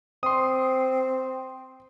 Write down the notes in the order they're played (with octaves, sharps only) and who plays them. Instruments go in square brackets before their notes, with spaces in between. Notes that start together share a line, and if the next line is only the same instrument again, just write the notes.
[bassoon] C4 [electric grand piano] C6 D#6